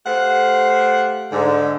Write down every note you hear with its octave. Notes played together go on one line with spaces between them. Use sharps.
A3 G4 C5 F5 F#5
G#2 D3